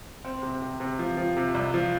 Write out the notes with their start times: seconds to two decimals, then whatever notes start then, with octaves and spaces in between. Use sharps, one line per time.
0.25 C4
0.43 C3
0.62 C3
0.80 C3
0.99 F3
1.17 F3
1.37 C3
1.54 C2
1.74 F3